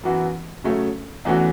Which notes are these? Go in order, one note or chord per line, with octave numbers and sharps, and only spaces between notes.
F#2 E3 B3 F#4
C#3 F#3 A3 C#4
E2 E3 A3 C#4 F#4